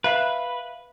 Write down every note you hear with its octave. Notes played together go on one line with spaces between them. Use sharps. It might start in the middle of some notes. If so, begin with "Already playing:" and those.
B4 E5 F5